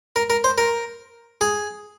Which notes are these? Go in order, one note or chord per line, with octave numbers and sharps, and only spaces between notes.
A#4
A#4
C5
A#4
G#4